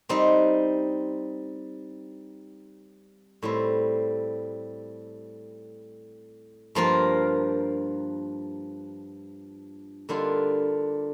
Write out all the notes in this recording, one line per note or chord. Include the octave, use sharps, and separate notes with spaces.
G3 C4 D#4
A2 G3 C4
G2 F3 A#3 F4 A#4
D3 G3 A#3 D4 F4